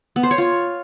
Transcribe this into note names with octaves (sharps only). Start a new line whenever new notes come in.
B3
C5
C#5
F4